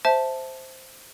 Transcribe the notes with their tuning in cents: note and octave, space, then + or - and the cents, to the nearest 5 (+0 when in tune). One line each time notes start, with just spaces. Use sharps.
C5 +0 E5 +0 A5 +0